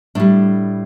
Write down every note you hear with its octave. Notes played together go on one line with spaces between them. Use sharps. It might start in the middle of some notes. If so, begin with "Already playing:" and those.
A2 G3 D4